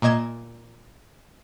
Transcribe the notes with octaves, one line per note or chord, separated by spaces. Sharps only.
A#2 A#3 D#5 G#6 E7